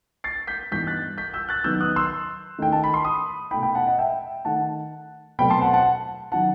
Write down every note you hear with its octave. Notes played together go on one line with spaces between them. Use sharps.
A6 C7
G6 B6
G2 E3 B3 D#4 G6 B6
F#6 A6
G6 B6
E6 G6
F#6 A6
D#3 F#3 B3 D#4 E6 G6
D#6 F#6
C6 E6
D#3 A3 D#4 G5
A5
B5
C6
B5 D#6
B2 A3 D#4 G5 B5
G5 B5
F#5 A5
D#5 F#5
E5 G5
D#3 A3 D#4 F#5 A5
B2 F#3 A3 C4 G5 B5
A5 C6
F#5 A5
F#5 A5
D#3 F#3 F#5 A5